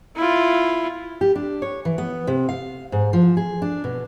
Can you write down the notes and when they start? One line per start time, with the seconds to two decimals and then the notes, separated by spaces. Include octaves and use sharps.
0.16 E4 F4
1.21 G4
1.35 D4
1.62 C#5
1.85 E3
1.98 B3
2.27 C3
2.49 F5
2.92 G#2
3.13 F3
3.37 G#4
3.62 D4
3.84 B2